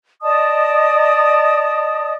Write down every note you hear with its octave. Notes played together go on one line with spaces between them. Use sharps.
D5 D#5 A5 D#6